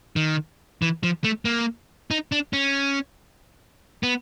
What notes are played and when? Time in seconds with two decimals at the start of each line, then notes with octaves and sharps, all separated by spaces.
0.16 D#3
0.82 E3
1.03 F3
1.24 A3
1.45 A#3
2.11 D#4
2.32 D4
2.53 C#4
4.03 B3